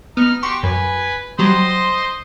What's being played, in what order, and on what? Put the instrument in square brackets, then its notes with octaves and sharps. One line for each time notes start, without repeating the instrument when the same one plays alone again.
[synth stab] B3 [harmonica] D#4 F6
[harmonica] F#4 G4 [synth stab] C6 C#6
[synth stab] F#2 [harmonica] B4 G#5
[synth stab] F#3 G3 [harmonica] C5 D#5 C6